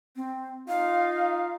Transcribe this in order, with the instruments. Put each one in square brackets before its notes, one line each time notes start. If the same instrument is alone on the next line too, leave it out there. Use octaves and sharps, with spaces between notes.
[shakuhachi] C4
[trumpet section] D#4 F4 [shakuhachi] F5